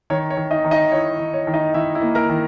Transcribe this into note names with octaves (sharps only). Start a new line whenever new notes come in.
D#3 C#5
C#5
D#3
D#4 D#5
D#3
D#4 D#5
E4 C#5
D#3
C#5
D#3
D#4 D#5
D#3 E4 E5
E4 E5
A#3
A#4 A#5
D#3